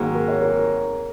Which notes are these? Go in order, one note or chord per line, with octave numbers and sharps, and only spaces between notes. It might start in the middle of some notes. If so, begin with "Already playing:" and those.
Already playing: G#2 D#3 F#3 A#3 F#4 G#4
A#4
C#5
A#4